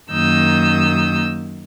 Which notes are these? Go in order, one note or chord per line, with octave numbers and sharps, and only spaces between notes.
F#2 D#3 A#3 D#6 E6 G6